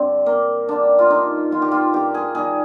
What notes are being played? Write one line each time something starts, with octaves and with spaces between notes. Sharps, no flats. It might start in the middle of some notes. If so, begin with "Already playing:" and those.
Already playing: G2 D3 G3 C4
G2 A#3
D3 G3 D4
F4
G2 D#4
D#3 G3 F4
G4
F4
G2 G4
G#4
D#3 G3 G#4